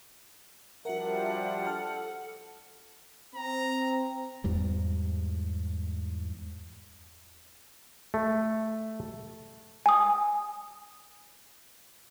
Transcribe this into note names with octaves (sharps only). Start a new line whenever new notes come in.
F3 G3 D4 F#4 A#4 E5 F#5
A4 A5 F6
C4 A#5
E2 G#2 G3
A3
G#5 D#6